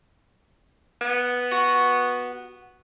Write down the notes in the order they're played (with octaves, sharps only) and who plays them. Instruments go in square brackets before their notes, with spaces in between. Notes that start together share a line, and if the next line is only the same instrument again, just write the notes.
[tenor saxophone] B3
[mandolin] F#4